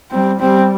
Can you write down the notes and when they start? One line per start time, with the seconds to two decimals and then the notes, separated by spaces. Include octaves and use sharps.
0.11 G3 C4
0.40 G3 C4